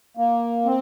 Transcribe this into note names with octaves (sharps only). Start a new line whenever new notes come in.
A#3
C4